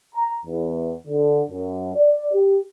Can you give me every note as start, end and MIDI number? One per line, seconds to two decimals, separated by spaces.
0.15 0.36 82
0.45 0.92 40
1.07 1.43 50
1.50 1.92 42
1.95 2.32 74
2.33 2.58 67